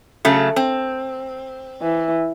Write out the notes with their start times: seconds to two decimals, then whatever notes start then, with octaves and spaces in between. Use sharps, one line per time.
0.25 C#3 F#3 A3
0.56 C4
1.82 E3